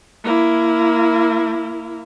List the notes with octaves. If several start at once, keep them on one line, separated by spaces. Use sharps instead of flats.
A#3 E4